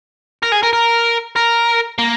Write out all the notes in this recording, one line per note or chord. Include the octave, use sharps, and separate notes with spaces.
A#4
G#4
A#4
A#4
A#4
A#3